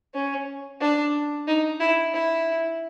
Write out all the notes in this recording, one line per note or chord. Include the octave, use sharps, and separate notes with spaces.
C#4
D4
D#4
E4
E4